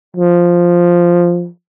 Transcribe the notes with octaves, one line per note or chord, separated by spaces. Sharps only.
F3